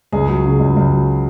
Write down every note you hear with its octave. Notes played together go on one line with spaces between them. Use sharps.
C#2 G#4
F#3
C#3
C#2
C#2
F#3